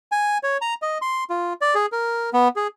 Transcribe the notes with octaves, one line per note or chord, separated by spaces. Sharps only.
G#5
C#5
A#5
D#5
C6
F4
D5
G#4
A#4
B3
G#4